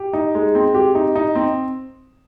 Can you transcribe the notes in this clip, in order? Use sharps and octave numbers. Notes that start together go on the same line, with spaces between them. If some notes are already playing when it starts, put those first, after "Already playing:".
Already playing: G4
D#4
G#3
C4
G4
D#4
D#4
C4